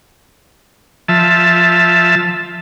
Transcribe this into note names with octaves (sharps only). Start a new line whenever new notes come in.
F3 E5 A5